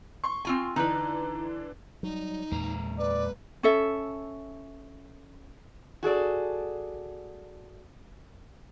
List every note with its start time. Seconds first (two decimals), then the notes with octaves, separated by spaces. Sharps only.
0.24 C6 C#6
0.45 C4 F4 G#5
0.76 D3 E3 D4 D#4 B4
2.03 F#3 G3 D#4
2.51 E2 A#2 G#3 A#3 A#5
2.99 B4 D5
3.63 C#4 A4 E5
6.03 F#4 G#4 A4 D5